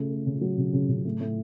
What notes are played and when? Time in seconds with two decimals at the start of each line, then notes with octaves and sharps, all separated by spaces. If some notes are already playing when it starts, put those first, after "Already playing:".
Already playing: C#3 A3
0.10 A3
0.26 C#3
0.41 F#3
0.58 C#3
0.73 C#3
0.89 C#3
1.05 A2
1.20 A2